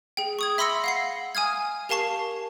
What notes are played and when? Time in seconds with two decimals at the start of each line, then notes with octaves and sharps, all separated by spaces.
0.17 G#4 G5
0.39 C#6 D#6 G#6
0.58 E5 B5 C6 E6 A#6 C#7
0.84 F5 F#5 C7
1.35 G#5 D#6 F6 G#6
1.89 G4 A#4 F5 A5 C#6 C7